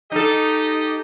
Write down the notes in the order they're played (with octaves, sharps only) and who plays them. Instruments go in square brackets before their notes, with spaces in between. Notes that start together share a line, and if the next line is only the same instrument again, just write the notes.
[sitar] D#4 A4 [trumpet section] G4 D#5